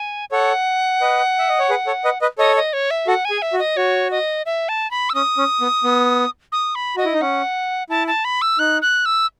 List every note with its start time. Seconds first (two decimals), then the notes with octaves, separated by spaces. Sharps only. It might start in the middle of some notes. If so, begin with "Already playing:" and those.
Already playing: G#5
0.31 A4 C#5 F#5
1.01 B4 D#5
1.38 E5
1.49 D#5
1.59 C#5
1.70 G#4 B4
1.87 A4 C#5
2.04 B4 D#5
2.21 B4 D#5
2.38 A4 C#5 D#5
2.56 D#5
2.73 C#5
2.91 E5
3.07 F#4 A4 F#5
3.25 G#5
3.30 G#4
3.42 E5
3.53 F#4
3.59 D#5
3.77 F#4 C#5
4.11 D#5
4.46 E5
4.69 A5
4.91 B5
5.10 E6
5.14 C#4 D#6
5.37 C#4
5.61 B3
5.84 B3
6.52 D#6
6.75 B5
6.97 F#4 D#5
7.05 E4
7.13 D#4
7.21 C#4 F#5
7.90 E4 A5
8.07 A5
8.24 B5
8.42 E6
8.59 D#4 F#6
8.82 F#6
9.05 E6